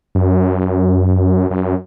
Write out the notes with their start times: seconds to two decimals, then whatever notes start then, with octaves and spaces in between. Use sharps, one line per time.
0.15 F#2
1.51 F#2